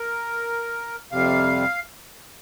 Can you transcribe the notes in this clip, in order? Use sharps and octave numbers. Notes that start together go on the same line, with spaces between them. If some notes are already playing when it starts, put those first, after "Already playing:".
Already playing: A#4
F2 C3 G3 F5